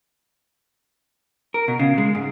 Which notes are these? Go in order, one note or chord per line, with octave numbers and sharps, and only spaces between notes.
A#4
B2
C#3
G#3
G#2